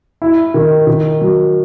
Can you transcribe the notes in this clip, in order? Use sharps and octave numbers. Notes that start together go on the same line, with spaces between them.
E4
D#3
D#3
F#3